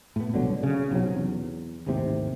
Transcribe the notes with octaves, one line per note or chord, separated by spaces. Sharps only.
A2 B3
C2 B2 D3 F#3
C#3
B1 C3 F#3
E2
G#1 D#2 A2 C3